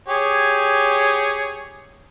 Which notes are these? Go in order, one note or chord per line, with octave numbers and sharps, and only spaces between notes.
G4 G#4 C#5